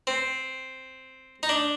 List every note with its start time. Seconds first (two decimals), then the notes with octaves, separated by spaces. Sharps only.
0.07 C4
1.43 D#4
1.49 D4